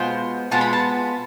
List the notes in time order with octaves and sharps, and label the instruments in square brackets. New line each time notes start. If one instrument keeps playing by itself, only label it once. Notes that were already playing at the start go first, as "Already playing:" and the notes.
Already playing: [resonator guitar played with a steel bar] B2 G#3 B3 F4 [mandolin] C5
[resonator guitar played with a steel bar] B2 G#3 B3 F4 [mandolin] A5
[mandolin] B5
A5